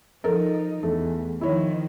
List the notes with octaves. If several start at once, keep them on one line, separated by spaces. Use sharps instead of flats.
F3 D#4 A4 A#4
E2 A3
D#3 F3 E4 C#5